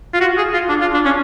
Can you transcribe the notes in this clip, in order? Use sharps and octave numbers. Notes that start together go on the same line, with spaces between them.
F4
F#4
G#4
F4
D4
F4
D4
C#4